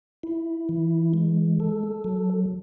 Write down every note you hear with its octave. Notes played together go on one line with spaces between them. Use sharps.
E4
E3
G#3
A4
F#3